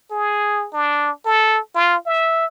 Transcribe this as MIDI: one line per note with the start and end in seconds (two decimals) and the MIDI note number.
0.11 0.67 68
0.73 1.11 62
1.26 1.59 69
1.75 1.97 65
2.06 2.46 76